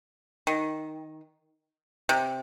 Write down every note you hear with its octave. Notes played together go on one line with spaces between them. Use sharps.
D#3
C3